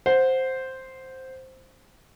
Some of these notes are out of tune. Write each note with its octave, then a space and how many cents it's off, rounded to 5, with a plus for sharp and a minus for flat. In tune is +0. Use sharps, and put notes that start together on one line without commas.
C5 +0 F#5 -15